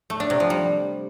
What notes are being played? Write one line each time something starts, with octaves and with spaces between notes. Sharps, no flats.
A3
D4
C3
F3
G3